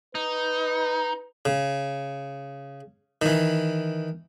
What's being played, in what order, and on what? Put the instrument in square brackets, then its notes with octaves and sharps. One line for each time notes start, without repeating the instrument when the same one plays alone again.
[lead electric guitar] D#4 [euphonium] B4
[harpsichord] C#3
D#3 E3